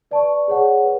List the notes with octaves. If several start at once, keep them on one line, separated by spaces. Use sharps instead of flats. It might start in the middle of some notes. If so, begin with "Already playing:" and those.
B4 D5 A5 C#6
G#4 C#5 F#5
B4